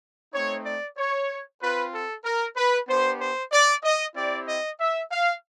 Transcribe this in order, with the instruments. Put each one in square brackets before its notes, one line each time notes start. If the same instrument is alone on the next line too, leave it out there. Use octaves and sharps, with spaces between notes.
[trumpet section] A3 C4 D#4 C#5
D5
C#5
C4 F4 B4
A4
A#4
B4
B3 D4 G4 C5
C5
D5
D#5
C4 E4 G4 D5
D#5
E5
F5